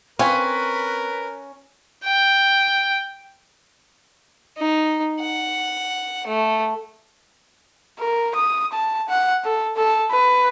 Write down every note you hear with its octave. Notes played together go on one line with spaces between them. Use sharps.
C4 C#4 A#4 B4 F5 G#5
G5
D#4
F#5
A3
A#4
D#6
A5
F#5
A4
A4
B4